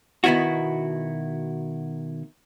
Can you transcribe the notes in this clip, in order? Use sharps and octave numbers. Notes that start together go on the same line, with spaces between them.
B2 D#3 B3 E4 F#4